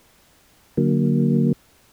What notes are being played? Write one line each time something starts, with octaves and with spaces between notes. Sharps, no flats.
D3 F#3 A#3